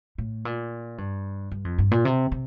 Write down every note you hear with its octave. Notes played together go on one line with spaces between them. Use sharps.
A2
A#2
G2
G2
F2
G2
A#2
C3
C3